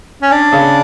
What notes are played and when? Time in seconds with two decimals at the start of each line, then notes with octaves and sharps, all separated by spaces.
0.22 C#4
0.32 D4
0.52 C#3